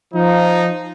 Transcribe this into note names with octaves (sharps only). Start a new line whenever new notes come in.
F3 D#4